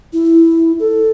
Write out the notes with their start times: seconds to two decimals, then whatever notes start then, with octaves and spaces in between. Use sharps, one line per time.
0.13 E4
0.80 A4